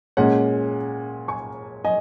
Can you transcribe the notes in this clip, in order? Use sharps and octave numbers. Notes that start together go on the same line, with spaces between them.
A#2 G#3 C#4 C#5 F#5
G#5 C#6
D#5 G#5